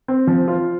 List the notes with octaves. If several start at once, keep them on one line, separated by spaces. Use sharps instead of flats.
C4
F3
F4